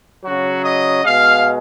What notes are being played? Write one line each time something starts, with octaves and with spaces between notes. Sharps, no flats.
C#3 F#3 F#4
D#5
B2 G#3 F5